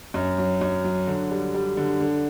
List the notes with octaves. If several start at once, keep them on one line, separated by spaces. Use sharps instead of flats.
F#2
F#3
F#2
F#3
D3
G3
G3
D3
D3